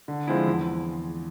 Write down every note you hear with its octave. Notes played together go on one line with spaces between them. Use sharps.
D3
F3 G#3 C4 E4
E2